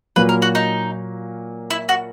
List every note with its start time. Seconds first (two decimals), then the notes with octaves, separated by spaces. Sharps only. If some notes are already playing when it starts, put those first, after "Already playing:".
0.16 A#2 F#3 A#3 B4
0.29 A#4
0.42 F#4
0.55 D#4
1.70 E4
1.89 F#4